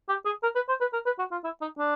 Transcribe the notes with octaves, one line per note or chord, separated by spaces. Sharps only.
G4
G#4
A#4
B4
C5
B4
A#4
B4
F#4
F4
E4
D#4
D4